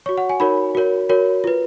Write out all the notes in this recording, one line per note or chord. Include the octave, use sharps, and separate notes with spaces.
F#4 C#5 C#6
F#5
G#5
D#4 F#4 A#4 C#5 B5
F#4 A#4 C#5
F#4 A#4 C#5
F4 B4